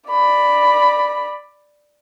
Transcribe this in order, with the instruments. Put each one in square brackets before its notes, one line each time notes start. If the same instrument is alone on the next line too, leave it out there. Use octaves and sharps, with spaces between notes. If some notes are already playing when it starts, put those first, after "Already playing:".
[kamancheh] D5 B5